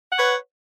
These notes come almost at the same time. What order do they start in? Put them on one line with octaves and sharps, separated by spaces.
F#5 B4 C#5